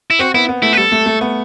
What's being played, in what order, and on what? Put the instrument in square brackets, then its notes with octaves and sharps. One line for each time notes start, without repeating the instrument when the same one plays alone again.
[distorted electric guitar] E4
[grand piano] C4 [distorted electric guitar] F#4
[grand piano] B3 [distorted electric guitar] E4
[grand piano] B3
[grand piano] A3 [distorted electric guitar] E4
[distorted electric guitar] B4
[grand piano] G3 [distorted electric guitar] A4
[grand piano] A3
A3
B3